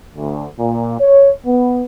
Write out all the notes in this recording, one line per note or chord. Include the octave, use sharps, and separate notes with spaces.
D2
A#2
C#5
B3